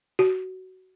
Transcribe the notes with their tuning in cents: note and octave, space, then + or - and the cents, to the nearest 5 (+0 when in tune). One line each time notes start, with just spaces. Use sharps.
F#4 +15